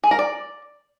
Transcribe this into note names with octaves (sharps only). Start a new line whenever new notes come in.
G#4
A#4
D5